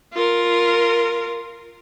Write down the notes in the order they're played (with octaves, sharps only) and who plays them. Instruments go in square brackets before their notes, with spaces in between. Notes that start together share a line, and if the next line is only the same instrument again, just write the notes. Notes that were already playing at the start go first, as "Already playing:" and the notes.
[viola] F4 A#4